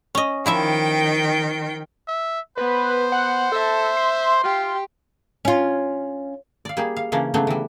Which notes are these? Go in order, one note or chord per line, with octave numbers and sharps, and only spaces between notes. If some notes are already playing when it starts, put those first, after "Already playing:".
C#4 D#5
D#3 F3 E4 E5 G5
E5
B3 B4 C5
F#5
A4 E5
C6
F4 G4
C#4 F4
D5 F5
G3 A#3 G4 G#4
F5
C#3 E3 A#3 C#4 D4
C#3 F#3 A3 B3 D4
E3 G3